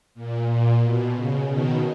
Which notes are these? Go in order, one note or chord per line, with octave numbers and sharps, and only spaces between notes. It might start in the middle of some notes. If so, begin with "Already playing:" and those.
A#2
A#2
B2
C#3
B2 D#3